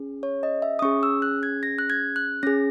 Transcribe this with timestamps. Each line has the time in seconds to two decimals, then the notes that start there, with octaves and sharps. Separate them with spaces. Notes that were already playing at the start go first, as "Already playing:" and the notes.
Already playing: C#4 G#4
0.23 C#5
0.43 D#5
0.62 E5
0.79 D#6
0.82 C#4 G#4 C#6
1.03 E6
1.22 F#6
1.43 G#6
1.63 A#6
1.79 F#6
1.90 G#6
2.16 F#6
2.43 C#4 A#6
2.47 G#4